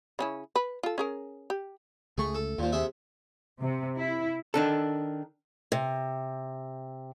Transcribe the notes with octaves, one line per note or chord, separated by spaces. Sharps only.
C#3 C#4 E4
B4
F4 A4
C#4 G#4 A#4
G4
C#2 A3 G#4 C#6
A4
D#2 A#2 F3
C3 G#4 E5
C3
E4
D#3 D4 A4
C3